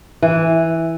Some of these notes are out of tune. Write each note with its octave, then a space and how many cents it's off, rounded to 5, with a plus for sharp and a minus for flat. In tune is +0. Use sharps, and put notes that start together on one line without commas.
E3 -5